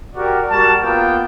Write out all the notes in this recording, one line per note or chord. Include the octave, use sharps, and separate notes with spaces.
F#4 G4 A#4 D5
G3 F#4 A#4 A5
A#3 B3 F4 G5